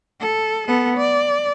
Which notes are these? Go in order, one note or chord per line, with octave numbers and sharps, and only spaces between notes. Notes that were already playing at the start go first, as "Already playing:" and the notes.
A4
B3 A4
D5